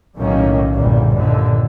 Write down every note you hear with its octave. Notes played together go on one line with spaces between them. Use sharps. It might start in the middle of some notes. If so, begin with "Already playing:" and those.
B1 F#2 A2 D#3 A#3 C#4
G1 E2 A#2 G3
D#2 A#2 D3